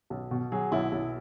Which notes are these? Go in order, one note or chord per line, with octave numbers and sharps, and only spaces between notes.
B1
B2
F#3 G#4
B1 E4
B1